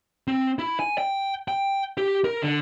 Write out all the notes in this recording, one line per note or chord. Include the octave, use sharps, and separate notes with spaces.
C4
E4
G#5
G5
G5
G4
A#4
D3